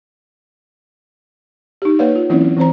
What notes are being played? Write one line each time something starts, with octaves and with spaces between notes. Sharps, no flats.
D#4 G4
A#3 B4 C#5 D5 F5
F4
E3 F#3 A#3 C4 C#4 E4
E3 C4 C5 A#5